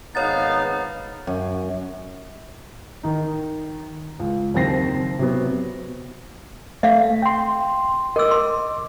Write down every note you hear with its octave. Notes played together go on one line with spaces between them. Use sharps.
G#1 B3 D#4 C#5 F5 A6
F#2
D#3 D#4
C#2
F#1 D#2 C4 A#6 C7
C3 F#3 B3
A3 E5 F5
G5 C6
A#4 D#5 D6 E6
C6